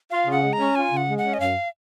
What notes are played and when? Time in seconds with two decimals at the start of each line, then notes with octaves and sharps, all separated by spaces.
0.10 F4 F5
0.27 C#3 F#5
0.42 G#3
0.53 A#5
0.59 C#4
0.75 F4 G#5
0.91 C#3
0.97 F#5
1.07 G#3
1.18 F#5
1.24 C#4
1.34 D#5
1.40 F#2 F5